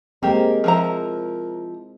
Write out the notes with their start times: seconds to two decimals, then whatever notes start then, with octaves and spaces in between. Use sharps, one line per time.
0.23 G#3 A#3 C4 G4 A#4
0.64 F3 E4 A#5